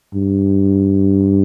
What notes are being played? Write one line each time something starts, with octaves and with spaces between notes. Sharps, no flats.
G2